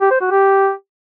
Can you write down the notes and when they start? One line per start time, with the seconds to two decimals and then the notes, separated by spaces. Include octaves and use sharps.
0.01 G4
0.11 C5
0.21 F#4
0.31 G4